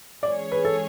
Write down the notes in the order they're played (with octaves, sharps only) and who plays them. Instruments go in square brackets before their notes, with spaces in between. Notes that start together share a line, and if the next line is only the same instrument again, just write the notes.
[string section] E3 G#3 C#4 G#4 C#5 [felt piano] D5
[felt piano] B4
A4